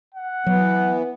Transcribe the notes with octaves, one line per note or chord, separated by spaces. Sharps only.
F#5
E3 F#3 B3